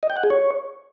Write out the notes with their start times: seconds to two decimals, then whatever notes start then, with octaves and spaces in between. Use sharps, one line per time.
0.03 D#5
0.10 G5
0.17 F#5
0.23 G#4
0.30 C#5